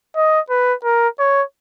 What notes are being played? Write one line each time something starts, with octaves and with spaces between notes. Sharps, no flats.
D#5
B4
A#4
C#5